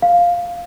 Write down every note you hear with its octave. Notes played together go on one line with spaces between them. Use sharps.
F5